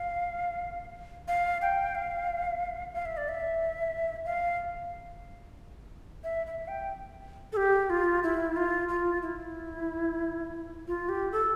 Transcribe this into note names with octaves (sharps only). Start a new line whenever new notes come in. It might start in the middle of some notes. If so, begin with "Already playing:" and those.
Already playing: F5
F5
G5
F5
F5
E5
D5
E5
F5
E5
E5
G5
A4
G4
F4
E4
F4
F4
E4
F4
G4
A4